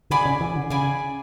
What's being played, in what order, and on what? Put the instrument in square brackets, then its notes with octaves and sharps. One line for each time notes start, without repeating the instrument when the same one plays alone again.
[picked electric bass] D3 [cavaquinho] G#4 D5 G#5 B5
[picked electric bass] C#3
E3
D3
[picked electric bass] C#3 [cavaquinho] G#4 D5 G#5 B5